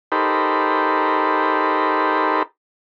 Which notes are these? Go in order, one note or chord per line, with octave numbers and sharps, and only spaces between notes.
D#4 G4 A4 A#4 C5 B5